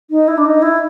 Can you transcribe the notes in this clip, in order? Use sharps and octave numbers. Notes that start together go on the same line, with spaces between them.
D#4
E4
D4
D#4
E4